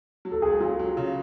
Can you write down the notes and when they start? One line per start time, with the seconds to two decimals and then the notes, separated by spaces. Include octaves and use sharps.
0.25 F#3
0.31 A4
0.42 C#2 G#4
0.60 F#3 F4
0.79 F#3
0.97 C#3